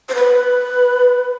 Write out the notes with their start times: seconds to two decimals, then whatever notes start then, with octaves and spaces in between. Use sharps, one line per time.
0.09 C5
0.15 B4